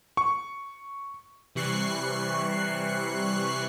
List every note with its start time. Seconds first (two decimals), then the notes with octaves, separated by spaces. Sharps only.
0.17 C#6
1.55 C3 E3 G3 C#6 F#6 C7